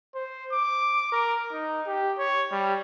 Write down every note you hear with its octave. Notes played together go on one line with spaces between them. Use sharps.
C5
D6
A#4
D#4
G4
C#5
G3